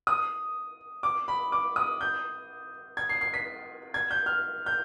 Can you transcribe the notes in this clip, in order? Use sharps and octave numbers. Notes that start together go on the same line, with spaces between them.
D#6
D6
B5
D6
D#6
G6
G#6
C7
C7
B6
G#6
G6
F6
G6